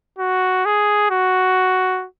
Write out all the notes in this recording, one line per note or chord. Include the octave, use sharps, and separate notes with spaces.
F#4
G#4
F#4